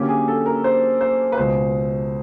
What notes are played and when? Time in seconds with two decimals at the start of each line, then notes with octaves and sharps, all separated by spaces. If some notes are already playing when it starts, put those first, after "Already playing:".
Already playing: D3 F#3 A#3 C#4 G4
0.09 G#4
0.28 A4
0.46 A#4
0.64 C5
1.01 C5
1.32 B4
1.37 C#2 B2 G#3 C5